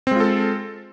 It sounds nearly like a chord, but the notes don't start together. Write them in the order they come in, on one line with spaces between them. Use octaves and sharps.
C4 G#3 F4 A4